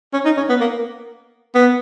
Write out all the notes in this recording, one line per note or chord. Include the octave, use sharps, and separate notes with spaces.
C#4
D#4
C#4
B3
A#3
B3